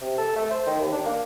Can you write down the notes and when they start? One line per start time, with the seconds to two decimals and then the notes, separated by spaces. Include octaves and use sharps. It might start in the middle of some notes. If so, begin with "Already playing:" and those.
0.01 C3
0.18 A4
0.36 A3
0.51 C5
0.67 D#3
0.80 D#2
0.92 D4
1.06 A#3